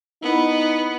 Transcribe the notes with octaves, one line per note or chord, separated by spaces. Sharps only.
B3 D#4 E4 F#5 B5